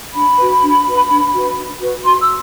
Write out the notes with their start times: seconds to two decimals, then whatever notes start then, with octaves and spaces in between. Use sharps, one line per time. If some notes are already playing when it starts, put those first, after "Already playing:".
0.12 D4 B5
0.37 F#4 B4
0.61 D4
0.85 F#4 B4
1.09 D4
1.32 F#4 B4
1.57 D4
1.80 F#4 B4
2.04 F#4 C6
2.20 E6